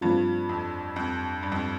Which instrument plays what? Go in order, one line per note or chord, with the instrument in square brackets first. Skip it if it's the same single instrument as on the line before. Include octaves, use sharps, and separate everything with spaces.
[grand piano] G2 [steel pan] F3 A3 C4 F4
[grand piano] F2
F2
G2
F2